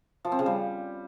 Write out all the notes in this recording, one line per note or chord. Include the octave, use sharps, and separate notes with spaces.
F3
C4
C#3
G3